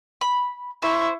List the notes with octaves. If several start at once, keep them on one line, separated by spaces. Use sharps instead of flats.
B5
E4 C5 C#6